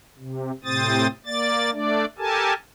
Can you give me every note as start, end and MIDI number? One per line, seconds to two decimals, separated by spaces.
0.19 0.51 48
0.64 1.07 45
0.64 1.07 48
0.64 1.07 60
0.64 1.07 72
0.64 1.07 87
0.64 1.07 93
1.26 1.71 58
1.26 1.71 74
1.26 1.71 93
1.72 2.05 57
1.72 2.05 62
1.72 2.05 74
2.18 2.53 67
2.18 2.53 69
2.18 2.53 70
2.18 2.53 80
2.18 2.53 81